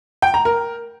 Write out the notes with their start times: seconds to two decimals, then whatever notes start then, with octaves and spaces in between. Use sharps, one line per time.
0.22 G5
0.34 A#5
0.45 A#4